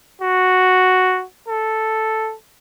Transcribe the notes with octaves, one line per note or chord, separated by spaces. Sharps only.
F#4
A4